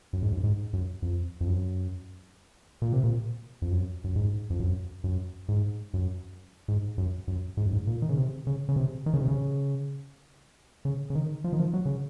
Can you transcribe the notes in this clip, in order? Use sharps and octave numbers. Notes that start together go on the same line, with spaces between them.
F#2
G#2
F#2
G#2
F#2
F2
F2
F#2
A#2
C3
A#2
F2
F#2
F#2
G#2
F2
F#2
F#2
G#2
F#2
G#2
F#2
F#2
G#2
F#2
G#2
A#2
D#3
C#3
C3
C#3
C#3
C3
D#3
C#3
C3
C#3
C#3
C#3
D#3
F3
D#3
F3
F#3
C#3